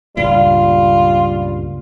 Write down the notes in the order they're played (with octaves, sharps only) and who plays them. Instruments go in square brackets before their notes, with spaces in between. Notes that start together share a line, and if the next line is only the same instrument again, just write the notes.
[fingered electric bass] C#2 G2 A#2 [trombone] G3 [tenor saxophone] F4